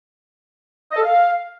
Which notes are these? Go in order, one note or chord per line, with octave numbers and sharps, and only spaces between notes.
D#5
A4
F5